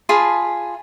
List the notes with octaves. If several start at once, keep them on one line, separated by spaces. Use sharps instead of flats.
F4 G#4 A5 B5